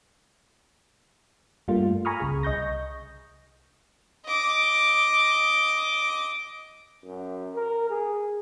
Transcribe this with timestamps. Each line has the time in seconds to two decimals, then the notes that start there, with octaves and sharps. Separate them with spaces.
1.68 G2 G3 A3 A#3 F4
2.05 G#5 A#5 B5 C#6 D#6 F6
2.20 C#2 C#3 G#4
2.43 C2 D#5 C#6 G6 A#6
4.26 D#5 D6
7.05 F#2
7.55 A#4
7.90 G#4